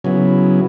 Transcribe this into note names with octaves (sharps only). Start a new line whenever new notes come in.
C#3 F#3 B3 E4